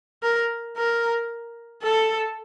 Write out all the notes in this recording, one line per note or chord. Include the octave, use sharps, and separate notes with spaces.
A#4
A#4
A4